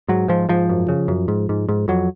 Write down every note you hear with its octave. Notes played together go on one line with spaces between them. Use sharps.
G#2 F#3
G#2 F3
G#2 F3
F#2
C#3
F#2
G#2
G#2
G#2
F2 F#3